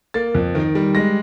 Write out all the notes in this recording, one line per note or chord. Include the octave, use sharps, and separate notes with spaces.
A#3 A6
F2
D#3
G3
G#3 A#6